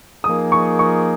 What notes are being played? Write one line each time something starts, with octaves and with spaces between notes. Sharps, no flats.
F3 A#3 D#4 G#4 D#6
C#6
C#6